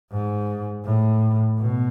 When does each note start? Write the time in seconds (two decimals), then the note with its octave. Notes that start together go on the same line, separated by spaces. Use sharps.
0.12 G#2
0.85 A2
1.59 B2